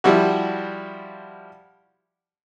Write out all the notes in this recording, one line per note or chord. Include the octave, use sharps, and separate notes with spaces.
F3 G3 E4 F#4